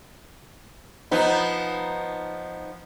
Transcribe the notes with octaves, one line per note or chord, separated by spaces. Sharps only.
F3 B3 D#4